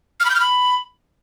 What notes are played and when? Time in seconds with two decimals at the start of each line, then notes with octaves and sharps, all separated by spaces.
0.20 F6
0.25 B5
0.30 G6
0.35 F6
0.40 B5